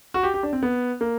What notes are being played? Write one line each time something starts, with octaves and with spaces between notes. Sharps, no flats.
F#4
G4
G4
D4
C4
B3
A#3